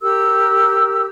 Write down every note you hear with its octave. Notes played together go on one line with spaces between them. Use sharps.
G4 A#4 E6